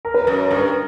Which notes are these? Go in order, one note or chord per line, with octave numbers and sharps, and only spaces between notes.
A#4
B4
F#2 A#4
G2 A#4